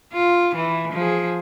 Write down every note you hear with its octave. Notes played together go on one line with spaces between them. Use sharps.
F4
E3
F3 G#4